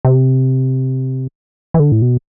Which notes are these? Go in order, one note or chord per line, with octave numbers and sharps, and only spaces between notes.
C3
E3
D3
A2
B2